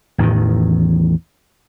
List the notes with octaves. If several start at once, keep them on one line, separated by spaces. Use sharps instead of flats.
A1 E2 A2 D#3